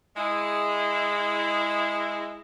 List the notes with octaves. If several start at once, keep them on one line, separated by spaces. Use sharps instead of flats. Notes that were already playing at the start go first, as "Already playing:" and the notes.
G#3 E4